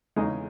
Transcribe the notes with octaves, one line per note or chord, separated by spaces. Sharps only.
E2 C#3 G#3 D#4